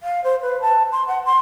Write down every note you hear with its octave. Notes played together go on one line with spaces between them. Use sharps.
F5
C5
B4
A5
C6
F#5
C6